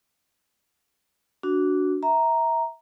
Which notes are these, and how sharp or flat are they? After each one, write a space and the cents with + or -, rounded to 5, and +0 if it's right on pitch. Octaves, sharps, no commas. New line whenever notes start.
D4 -15 F#4 +0
E5 -20 A#5 +0